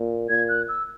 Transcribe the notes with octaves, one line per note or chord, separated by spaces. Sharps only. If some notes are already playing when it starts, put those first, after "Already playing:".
Already playing: A#2
A#2 G#6
F#6
E6